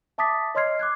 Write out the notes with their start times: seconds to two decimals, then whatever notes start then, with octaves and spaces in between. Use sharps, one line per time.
0.18 E5 A5 D6 D#6 A6 B6
0.55 C#5 D#5 C6 F6 G#6 C7
0.79 D6 F#6 G#6